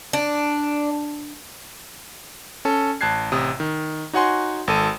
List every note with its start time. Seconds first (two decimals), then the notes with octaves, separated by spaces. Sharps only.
0.13 D4
2.65 C#4 A4
3.01 A1 A5 F#6 G#6 C7
3.32 A1 C3 D#6
3.60 D#3
4.13 D#4 F#4 C#5 F#5 G#5 C6
4.67 G#1 A4 D#7